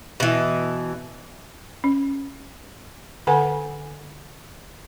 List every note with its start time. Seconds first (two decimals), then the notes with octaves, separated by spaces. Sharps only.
0.20 B2 E3
1.84 C#4
3.27 D3 A4 B4 F#5 G#5